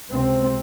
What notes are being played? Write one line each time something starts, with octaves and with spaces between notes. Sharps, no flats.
C#2 C3 C4